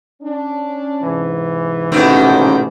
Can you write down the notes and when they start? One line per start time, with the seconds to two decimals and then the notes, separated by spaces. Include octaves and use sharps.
0.23 C#4 D4
1.03 G#2 C3 E3
1.92 A1 B2 D#3 C4 C#4